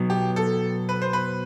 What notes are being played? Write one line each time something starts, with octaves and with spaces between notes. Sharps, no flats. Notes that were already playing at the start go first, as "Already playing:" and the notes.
Already playing: B2 F#3 B3
G4
A4
B4
C5
B4